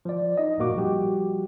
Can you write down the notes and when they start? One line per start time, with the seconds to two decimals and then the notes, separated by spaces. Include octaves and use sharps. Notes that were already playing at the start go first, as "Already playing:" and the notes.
0.05 F3 D5
0.37 D#4 D#5
0.58 B1 F#2 A#2 A#3 F#4 D6
0.75 F3 G3 F#4 G4